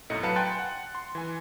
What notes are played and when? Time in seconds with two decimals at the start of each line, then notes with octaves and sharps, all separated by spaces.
0.10 B1 F#2 A2 D#5 C#7
0.23 F#3 B4 F5 A5 C#7
0.36 G5 G#5 C6 F#6 A6
0.59 F#5
0.95 C6
1.15 E3 G#5